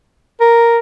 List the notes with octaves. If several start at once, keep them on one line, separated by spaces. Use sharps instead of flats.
A#4